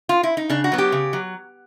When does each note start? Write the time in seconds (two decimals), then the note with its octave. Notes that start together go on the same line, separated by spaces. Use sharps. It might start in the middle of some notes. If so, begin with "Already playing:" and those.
0.09 F4
0.23 E4
0.37 D#4
0.50 C#3 D4
0.64 F#4
0.72 F#3 B3
0.78 G4
0.92 C#3
1.13 F#3